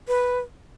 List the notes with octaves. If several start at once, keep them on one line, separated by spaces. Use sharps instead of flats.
B4